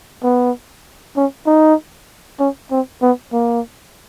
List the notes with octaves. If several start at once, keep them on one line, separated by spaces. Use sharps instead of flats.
B3
C#4
D#4
C#4
C4
B3
A#3